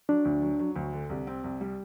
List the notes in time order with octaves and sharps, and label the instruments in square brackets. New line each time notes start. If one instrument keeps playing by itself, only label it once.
[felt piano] F#3 [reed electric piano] D4
[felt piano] D2
F#3
F#3
D2
D3
C2
C4
C2
G3